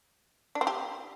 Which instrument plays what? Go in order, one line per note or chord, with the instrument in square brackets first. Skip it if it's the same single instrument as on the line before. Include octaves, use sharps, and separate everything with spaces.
[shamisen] D4
C4
G4